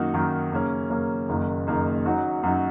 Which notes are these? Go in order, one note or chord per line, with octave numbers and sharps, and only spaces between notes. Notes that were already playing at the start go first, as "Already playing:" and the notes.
Already playing: F#2 D#3 A#3 D#4 F#4
F#2 D#3 A#3 D#4 F#4
F#2 C#3 A#3 C#4
F#2 C#3 A#3 C#4
F#1 F#2 D#3 A#3 D#4
F#1 F#2 D#3 A#3 D#4
F#2 F#3 D#4 F#4
F#2 F#3 D#4 F#4